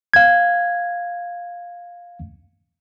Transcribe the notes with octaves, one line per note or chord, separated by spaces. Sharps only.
F5 G#6